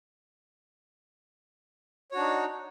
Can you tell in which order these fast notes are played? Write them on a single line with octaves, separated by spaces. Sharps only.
C#5 F#4 D4 D#4